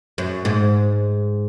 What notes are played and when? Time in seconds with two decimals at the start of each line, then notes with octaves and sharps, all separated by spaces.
0.18 F#2
0.45 G#2